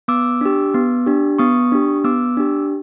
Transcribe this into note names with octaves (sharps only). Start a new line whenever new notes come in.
B3 D6 E6
D4 G4
B3
D4 G4
B3 C#6 D#6
D4 G4
B3 D6 E6
D4 G4